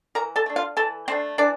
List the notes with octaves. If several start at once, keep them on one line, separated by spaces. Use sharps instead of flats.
E3 A#4 A#5
A4 A5
A3 D4
F4 F5
E3 A4 A5
A3 C4 D4 C5
E3 D4 D5